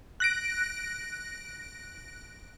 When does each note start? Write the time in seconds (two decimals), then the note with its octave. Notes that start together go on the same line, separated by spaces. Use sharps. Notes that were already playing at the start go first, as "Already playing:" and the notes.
0.20 F#6 A#6 D7